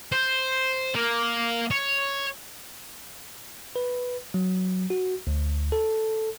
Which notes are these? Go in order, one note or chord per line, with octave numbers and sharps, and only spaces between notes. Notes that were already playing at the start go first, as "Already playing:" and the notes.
C5
A#3
C#5
B4
F#3
F#4
D2
A4